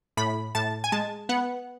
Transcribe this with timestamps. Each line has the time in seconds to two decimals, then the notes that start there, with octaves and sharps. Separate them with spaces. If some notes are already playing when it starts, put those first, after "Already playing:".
0.17 A2 B5
0.55 A2 A5
0.84 G#5
0.92 G#3 A5
1.29 B3 F#5